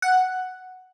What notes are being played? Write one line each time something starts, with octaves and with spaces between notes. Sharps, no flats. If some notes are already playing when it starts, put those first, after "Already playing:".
F#5